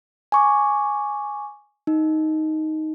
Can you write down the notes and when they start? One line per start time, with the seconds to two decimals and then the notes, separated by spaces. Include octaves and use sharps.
0.32 G#5 C#6 D6
1.87 D#4